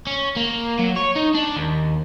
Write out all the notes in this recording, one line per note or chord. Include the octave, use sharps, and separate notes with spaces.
C#4
A#3
F#3
C#5
D#4
D4
D#2